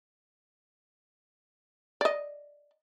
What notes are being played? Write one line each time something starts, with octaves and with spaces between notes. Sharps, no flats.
D5 D#5